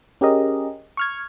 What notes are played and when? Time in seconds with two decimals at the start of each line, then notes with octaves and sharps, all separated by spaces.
0.21 C#4 G4 G#4 A#4 D#5
0.97 C#6 F6 G#6